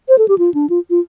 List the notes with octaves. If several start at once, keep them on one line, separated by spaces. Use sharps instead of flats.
C5
A4
G4
F4
D4
F4
F4